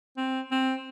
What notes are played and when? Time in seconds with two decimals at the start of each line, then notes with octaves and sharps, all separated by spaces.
0.17 C4
0.51 C4